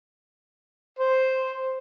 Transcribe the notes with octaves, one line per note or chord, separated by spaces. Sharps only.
C5